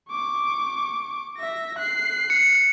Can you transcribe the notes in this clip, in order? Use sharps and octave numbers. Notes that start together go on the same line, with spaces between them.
C#6 D6
E5 A#6
F#6 C7
C#7